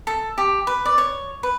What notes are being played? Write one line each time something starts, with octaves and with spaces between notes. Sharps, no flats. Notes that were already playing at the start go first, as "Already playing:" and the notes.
A4
G4
B4
D5
C#5
B4